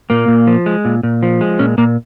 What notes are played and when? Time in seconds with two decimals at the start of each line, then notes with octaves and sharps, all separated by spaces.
0.10 A#2 A#3
0.28 A#2
0.47 F3
0.66 G#3
0.85 A#2
1.03 A#2
1.23 F3
1.41 G#3
1.59 A#2 C#4
1.78 A#2 A#3